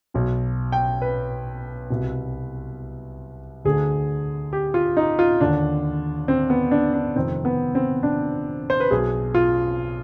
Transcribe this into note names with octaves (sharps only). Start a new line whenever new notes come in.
B1 B2
G5
B4
C2 B2
D2 D3 G#4
G4
F4
D#4
F4
D#2 D3 D4
C4
B3
D4
D4
F1 F2 D#3 C4
B3
C4
D4
C5
B4
B1 B2 G#4
F4